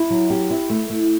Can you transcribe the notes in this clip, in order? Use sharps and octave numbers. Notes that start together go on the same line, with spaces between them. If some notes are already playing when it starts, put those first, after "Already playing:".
Already playing: E4
F#3
G4
E4
A3
A3